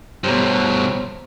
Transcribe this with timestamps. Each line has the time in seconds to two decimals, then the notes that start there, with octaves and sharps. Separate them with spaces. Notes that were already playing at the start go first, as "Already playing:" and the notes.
0.24 G2 B2 C5 C#5 A#5